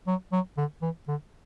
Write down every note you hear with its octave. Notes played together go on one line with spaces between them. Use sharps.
F#3
F#3
D3
E3
D3